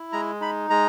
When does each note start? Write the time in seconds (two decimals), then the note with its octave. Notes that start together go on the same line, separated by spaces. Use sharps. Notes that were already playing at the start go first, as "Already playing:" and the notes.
Already playing: E4
0.12 G#3 A#5
0.41 D#4 B5
0.70 G#3 A#5